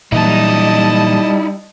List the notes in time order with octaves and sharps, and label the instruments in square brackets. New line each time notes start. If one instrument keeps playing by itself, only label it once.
[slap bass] A#2 E3 F#3 [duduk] G3 [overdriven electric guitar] D#4 E4 [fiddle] D#5 A5